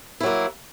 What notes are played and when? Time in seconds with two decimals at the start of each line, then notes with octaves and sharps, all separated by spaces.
0.20 E4
0.23 F#3
0.26 A#3